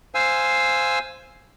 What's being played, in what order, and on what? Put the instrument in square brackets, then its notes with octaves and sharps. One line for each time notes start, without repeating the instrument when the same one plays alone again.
[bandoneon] C5 F5 G#5 E6